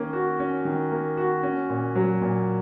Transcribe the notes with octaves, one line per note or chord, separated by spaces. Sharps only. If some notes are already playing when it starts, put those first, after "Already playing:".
Already playing: D#3 A#3 C#4
F#4
C#4
D#3
A#3
F#4
C#4
A#2
F#3
A#2